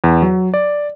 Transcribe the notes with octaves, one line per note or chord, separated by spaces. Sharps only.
E2
F#3
D5